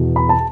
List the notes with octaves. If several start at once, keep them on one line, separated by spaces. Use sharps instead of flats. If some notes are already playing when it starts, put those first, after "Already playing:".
Already playing: E2 B2 B3
B5
A5